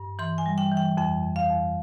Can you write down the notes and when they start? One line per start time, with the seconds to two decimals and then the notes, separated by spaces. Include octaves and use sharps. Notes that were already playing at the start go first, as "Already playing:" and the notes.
Already playing: G2
0.19 E3 C6
0.38 G#5
0.46 G3
0.58 G5
0.72 E3
0.77 G5
0.97 F2 G5
1.23 F2
1.36 F5
1.49 F2